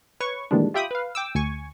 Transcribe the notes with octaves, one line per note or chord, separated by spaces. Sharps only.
B4 C#5 C#6
A#2 D#3 E3 G3 G#3 D4
F4 G4 E5 G5 B5 D#6
B4 F5
G5 D6 E6
D2 G#5 C#6